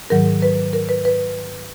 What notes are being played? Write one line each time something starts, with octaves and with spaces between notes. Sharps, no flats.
G#2 D#3 F#3 A#4
B4
A#4
B4
B4